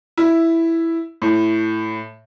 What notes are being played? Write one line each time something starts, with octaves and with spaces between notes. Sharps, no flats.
E4
A2